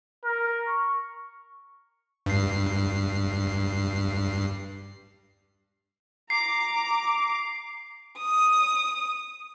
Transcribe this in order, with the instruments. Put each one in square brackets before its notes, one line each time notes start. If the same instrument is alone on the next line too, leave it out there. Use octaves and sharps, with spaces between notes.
[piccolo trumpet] A#4
C#6
[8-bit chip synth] G2 C7
[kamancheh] A#5 D6 [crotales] C7
[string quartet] D#6